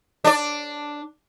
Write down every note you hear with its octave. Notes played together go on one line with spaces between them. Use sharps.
D4 D5